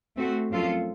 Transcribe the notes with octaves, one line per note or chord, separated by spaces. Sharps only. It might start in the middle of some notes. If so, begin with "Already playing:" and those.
A3 C4 F#4
F#2 F3 C4 F4 A4